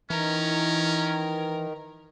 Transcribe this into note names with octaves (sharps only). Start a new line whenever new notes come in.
D#3 E3 C#4 A#4